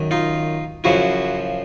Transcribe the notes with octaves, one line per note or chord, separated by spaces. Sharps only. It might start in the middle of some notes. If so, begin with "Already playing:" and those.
Already playing: F#2 D#3
D#4 F4
F#2 C#3 F3 E4 F#4